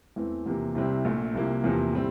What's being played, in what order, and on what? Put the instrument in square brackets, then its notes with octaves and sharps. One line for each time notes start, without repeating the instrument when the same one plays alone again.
[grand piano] E2 E3 A3 C4
E2 C3 F3 A#3
C2 C3 G3 C4 E4
A#1 A#2 A3
C2 C3 F3 A#3 E4
E2 C3 F3 A#3
A2 G3 C4